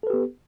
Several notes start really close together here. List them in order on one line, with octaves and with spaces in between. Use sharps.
A4 B4 G4 B3